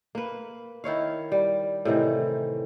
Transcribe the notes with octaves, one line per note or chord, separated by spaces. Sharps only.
A#3 B4
D#3 E4 C#5 F5
G3
A2 C3 D#3 E3